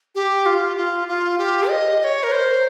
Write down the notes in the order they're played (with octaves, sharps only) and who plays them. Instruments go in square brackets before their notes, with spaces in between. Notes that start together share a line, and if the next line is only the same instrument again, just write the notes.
[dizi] G4
F4
F4
F4
G4
D#5
D#5
C#5
A#4
C5